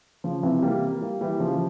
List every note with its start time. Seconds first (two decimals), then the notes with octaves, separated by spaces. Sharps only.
0.24 C#3 F3
0.43 C3 E3
0.62 G3 A#3
1.01 G3 A#3
1.21 E3 G3
1.40 C#3 F3